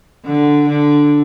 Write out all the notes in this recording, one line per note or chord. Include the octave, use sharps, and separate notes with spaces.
D3
D3